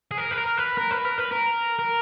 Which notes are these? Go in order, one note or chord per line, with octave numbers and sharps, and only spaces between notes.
G#4
A#4
B4
A#4
B4
A#4
B4
A#4
B4
A#4
A#4